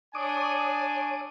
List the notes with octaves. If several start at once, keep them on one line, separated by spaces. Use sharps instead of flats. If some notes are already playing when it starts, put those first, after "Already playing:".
D4 C#5 G#5 D6 D#6